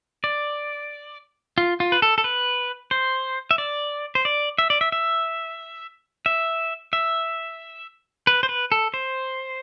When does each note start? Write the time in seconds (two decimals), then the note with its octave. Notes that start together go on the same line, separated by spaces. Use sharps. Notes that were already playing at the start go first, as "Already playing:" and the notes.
0.24 D5
1.58 F4
1.80 F4
1.92 B4
2.02 A4
2.18 A4
2.24 B4
2.91 C5
3.51 E5
3.58 D5
4.15 C5
4.25 D5
4.58 E5
4.70 D5
4.81 E5
4.92 E5
6.26 E5
6.93 E5
8.27 B4
8.43 C5
8.49 B4
8.72 A4
8.94 C5